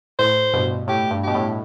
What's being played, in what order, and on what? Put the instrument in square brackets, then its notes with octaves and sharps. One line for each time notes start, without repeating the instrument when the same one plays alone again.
[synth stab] A2 [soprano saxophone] C5
[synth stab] G2 B2
[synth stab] A2 [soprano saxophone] G4
[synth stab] G2
[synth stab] B2 [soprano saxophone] G4
[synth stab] A2